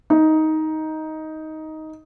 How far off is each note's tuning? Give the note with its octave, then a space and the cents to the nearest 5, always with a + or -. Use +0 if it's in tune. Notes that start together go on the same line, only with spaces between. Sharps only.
D#4 +10